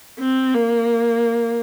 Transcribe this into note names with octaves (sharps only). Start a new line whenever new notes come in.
C4
A#3